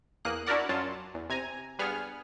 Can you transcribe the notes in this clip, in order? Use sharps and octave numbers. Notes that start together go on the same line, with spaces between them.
E2 A#3 D#6 F#6
D4 E4 F#4 A#4 D5 F#5
F#2 F#3 F4 A5
E2
C3 G#5 A#5
G2 B3 G#4 F6